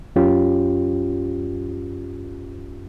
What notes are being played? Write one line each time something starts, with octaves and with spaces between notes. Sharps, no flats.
F#2 C#4 F4 G4